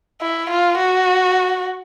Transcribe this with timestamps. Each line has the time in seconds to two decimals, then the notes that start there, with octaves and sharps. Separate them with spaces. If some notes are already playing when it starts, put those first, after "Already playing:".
0.22 E4
0.50 F4
0.78 F#4